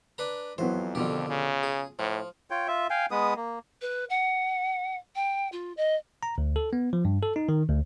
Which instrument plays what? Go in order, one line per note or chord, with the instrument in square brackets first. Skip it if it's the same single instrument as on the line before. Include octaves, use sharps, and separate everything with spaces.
[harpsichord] D4 B4 A#5
[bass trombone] F2 [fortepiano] E3 F#3 B3 [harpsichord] C5
[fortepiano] B2 F3 [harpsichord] D3 D#3 G4
[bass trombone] C#3
[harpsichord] G#4
[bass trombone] A2 [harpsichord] F3
[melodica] F4 C#5 G5
F4 E5
F5 G5 G#5
G#3 B3 B4 D#6
A#3
[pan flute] B4
F#5
G5
F4
D#5
[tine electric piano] A#5
D2
A4
B3
F3
G2
A4
D#4
D#3
D2